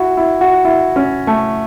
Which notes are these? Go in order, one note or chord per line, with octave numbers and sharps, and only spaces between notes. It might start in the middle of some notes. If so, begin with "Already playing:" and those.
Already playing: E4 F#4
E4
F#4
E4
C#4
A3